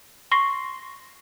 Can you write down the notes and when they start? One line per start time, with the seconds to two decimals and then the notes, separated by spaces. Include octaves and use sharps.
0.31 C6 C#6 A#6 C7